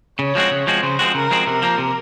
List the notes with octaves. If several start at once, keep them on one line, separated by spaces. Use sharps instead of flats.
C#3 C#5
F3 G#3 C4 F#4
C#3
F3 G#3 C4 F#4
C#3 C5
F3 G#3 C4 F#4
C#3 A#4
F3 G#3 C4 F#4
C3 A#4
F3 A#3
C3